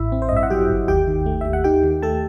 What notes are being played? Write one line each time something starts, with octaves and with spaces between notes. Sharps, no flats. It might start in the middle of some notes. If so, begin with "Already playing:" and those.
Already playing: A1 E4 E5
C4
C5
G2 D#5
E5
F#5
F#3 G4 G5
G1
D#2 G4 G5
D#3
A3
D#2 E5
F#5
D#4 G4 G5
D#3
A3 A4 A5